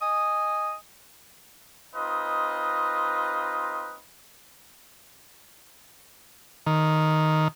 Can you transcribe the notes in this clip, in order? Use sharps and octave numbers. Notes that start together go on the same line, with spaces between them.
D#5 G#5 D#6
C4 D#4 F4 B4 D#5
D#3